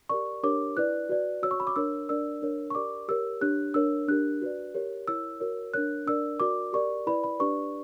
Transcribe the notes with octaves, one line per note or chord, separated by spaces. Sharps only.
G4 A#4 D5 C#6
D4 G4 A#4 C#5 D6
E4 B4 D5 F#6
F#4 B4 D5
F#4 C#5 E6
C#6
B5
D6
D4 A#4 C#5 E6
D4 A#4 D5 E6
D4 A#4 C#5
C#6
G4 A#4 D5 D6
G4 A#4 C#5 E6
D4 G4 C#5 F#6
D4 A#4 C#5 E6
D4 G4 A#4 F#6
F#4 B4 D5
G4 A#4 C#5
E4 A#4 C#5 E6
F#4 A#4 C#5
D4 A#4 C#5 F#6
D4 A#4 D5 E6
F#4 A#4 D5 D6
G4 A#4 D5 C#6
E4 B4 D5 B5
B5
D4 G4 B4 D5 C#6